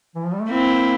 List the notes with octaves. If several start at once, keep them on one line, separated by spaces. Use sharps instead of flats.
E3
F3
G3
A3
A#3 C4 E4